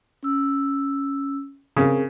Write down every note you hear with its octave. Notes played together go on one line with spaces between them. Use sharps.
C#4 E6
C#3 C4 G#4 A#4